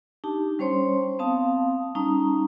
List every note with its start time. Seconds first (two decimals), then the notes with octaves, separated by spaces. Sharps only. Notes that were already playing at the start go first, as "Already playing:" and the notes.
0.24 D4 D#4 G4 A5
0.59 G3 C#4 C5 C#5 C6
1.19 B3 C4 F5 A5 D#6
1.95 G3 C#4 D#4 A5 A#5 D#6